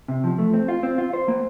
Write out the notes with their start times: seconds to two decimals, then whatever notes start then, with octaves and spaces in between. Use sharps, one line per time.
0.08 C3
0.24 F3
0.38 A3
0.54 C4
0.68 F4
0.83 C4
0.98 F4
1.13 C5
1.28 A#3